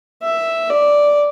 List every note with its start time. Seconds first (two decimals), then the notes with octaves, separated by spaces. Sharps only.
0.23 E5
0.70 D5